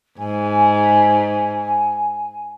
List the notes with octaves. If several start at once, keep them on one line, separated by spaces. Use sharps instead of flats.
G#2 G#5